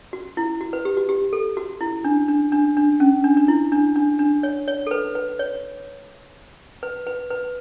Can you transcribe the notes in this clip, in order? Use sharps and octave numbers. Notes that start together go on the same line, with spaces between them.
F#4
E4
F#4
B4
G4
F#4
G4
A4
F#4
E4
D4
D4
D4
D4
C#4
D4
D4
E4
D4
D4
D4
C#5
C#5
A4
B4
B4
C#5
B4
B4
B4